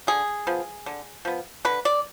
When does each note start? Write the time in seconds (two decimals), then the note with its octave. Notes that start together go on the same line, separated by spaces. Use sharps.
0.07 D3 G#4
0.47 F3 B3
0.86 D3
1.25 F3 B3
1.65 D3 B4
1.85 D5